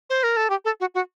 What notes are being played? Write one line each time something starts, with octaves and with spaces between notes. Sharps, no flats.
C5
A#4
A4
G4
A4
F#4
F#4